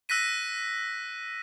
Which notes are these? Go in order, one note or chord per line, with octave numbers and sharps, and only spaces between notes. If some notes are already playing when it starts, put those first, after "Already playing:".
E6 F#6 A#6 B6 D#7